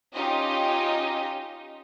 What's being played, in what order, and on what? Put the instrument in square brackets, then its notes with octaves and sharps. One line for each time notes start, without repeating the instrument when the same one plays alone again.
[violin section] C#4 D#4 F4 G4 D#5